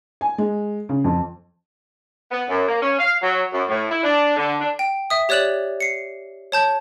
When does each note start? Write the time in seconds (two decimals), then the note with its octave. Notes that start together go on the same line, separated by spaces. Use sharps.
0.21 G#5
0.38 G#3
0.89 C#3
1.04 F2
2.31 B3
2.48 F#2
2.67 A#3
2.82 C#4
2.98 F5
3.21 F#3
3.52 F#2
3.69 A2
3.90 E4
4.03 D4
4.36 D3
4.60 D4
4.79 G5
5.10 E5 D#6
5.29 G4 C#5 D5 F#6 E7 F#7
5.80 C7 C#7
6.52 C#5 A5 G6